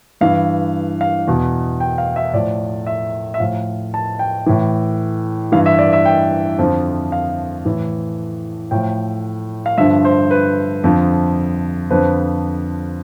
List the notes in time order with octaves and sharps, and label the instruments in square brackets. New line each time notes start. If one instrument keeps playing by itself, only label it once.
[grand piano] G2 E3 F5
F5
E2 B2
G5
F5
E5
A2 F3 D5
E5
E5
A2 F3 F5
A5
G5
A2 E3
G2 E3 F5
E5
D5
E5
G5
F2 D3 F3
F5
A2 E3
A2 F3 G5
F5
G2 D3 F3 E5
C5
B4
F2 D3 F3
F2 D3 F3 B4